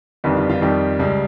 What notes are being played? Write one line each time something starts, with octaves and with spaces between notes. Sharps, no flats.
G1 F2 D#3 G3
F4
F4
F2 D#3 G3
C#2 C#3 G3